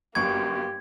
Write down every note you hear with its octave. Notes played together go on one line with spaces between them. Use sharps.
G1 F#2 A#3 G4 C#6 G#6